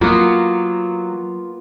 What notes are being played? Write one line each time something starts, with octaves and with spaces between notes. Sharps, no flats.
F#3 A#3 B3 F4